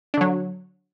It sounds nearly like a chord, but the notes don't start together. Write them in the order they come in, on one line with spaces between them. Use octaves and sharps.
D4 D3 F#3